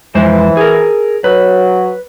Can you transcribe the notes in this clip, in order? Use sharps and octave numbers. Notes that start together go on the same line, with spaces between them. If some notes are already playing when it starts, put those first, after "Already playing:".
F2 E3 G#3 C5
G#4 A#4
F#3 B4